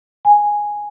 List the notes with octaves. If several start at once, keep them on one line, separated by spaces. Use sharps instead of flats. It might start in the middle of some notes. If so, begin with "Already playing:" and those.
G#5